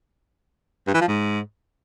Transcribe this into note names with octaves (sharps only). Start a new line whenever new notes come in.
G2
E3
F3
G#2